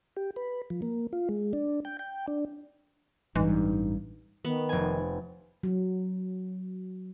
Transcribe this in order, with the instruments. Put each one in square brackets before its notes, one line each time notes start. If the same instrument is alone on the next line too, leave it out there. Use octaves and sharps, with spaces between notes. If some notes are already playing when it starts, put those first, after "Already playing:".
[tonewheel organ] G4
B4
F3
A#3
F4
G#3
D4
G5
G5
D4
[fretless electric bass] A1 G2 [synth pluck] E3 G#3 [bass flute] D#4
[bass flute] D#3 [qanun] B3
[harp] F1 G#5
[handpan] F#3